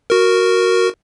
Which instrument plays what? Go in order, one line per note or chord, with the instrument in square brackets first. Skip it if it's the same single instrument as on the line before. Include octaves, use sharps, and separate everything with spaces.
[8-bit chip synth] F#4 A#4